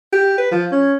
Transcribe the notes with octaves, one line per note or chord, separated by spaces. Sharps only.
G4
B4
F3
C#4